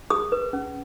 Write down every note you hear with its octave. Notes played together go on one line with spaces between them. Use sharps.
G#4 D#6
B4
C#4